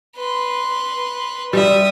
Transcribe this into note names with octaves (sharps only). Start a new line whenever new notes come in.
B4 C6
G3 E5 D#6